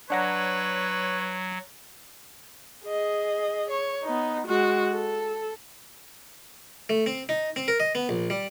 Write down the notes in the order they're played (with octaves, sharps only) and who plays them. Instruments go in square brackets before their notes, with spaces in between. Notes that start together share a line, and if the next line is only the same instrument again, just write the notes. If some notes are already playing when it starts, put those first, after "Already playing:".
[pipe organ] F#3 [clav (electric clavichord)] D4 F#5 A#5 [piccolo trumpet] B4 [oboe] C#5
[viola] G#4 D#5
C#5
B3 D#4
G#3 F#4
A4
[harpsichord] A3
C4
D#4
C4
A#4
D#5
B3
A#1
G3